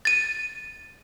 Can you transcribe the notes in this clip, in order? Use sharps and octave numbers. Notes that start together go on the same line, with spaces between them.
A6 D#7